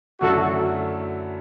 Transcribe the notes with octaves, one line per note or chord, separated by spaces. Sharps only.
F#2 D3 F#3 A3 E4 F#4 A4